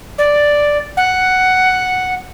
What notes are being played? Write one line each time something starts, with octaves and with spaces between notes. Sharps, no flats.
D5
F#5